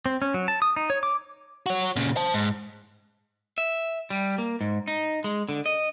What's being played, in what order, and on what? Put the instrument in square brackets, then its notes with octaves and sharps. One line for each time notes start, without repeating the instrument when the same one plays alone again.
[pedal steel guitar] C4
C#4
F#3
A5
D#6
D#4
C#5
D6
[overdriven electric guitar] F#4 C#5
A#2 C#3
C5 A5
G#2
[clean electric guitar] E5
G3
A#3
G#2
D#4
G#3
D3
D#5